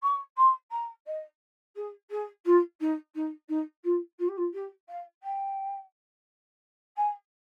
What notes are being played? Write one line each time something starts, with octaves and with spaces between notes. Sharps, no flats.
C#6
C6
A#5
D#5
G#4
G#4
F4
D#4
D#4
D#4
F4
F4
G4
F4
G4
F5
G5
G#5